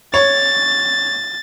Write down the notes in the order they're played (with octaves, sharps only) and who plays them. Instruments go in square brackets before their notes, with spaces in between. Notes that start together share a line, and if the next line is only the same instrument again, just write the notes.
[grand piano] C#5 [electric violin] A6